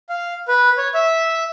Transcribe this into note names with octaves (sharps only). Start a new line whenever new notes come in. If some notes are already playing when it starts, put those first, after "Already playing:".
F5
B4
C#5
E5